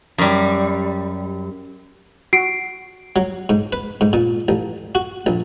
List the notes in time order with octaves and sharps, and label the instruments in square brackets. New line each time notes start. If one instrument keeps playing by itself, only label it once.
[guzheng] F#2 G3
[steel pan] F#4 [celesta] C7 D7
[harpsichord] F#3
G#2
B4
G#2
A#2
A1
F#4
A#1